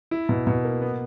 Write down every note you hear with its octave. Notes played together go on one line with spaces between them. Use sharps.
E4
B2
B2
A#3
B3